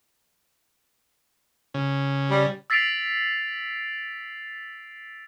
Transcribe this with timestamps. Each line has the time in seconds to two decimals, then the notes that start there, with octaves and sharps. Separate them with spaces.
1.74 C#3
2.30 G3
2.70 E6 A6 B6 C7 D7 F7